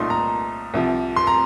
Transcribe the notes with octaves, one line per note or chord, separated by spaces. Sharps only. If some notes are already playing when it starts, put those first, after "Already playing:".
Already playing: C2 A#2 A3 D#4 C6
A#5
C2 C3 F3
C6
A#5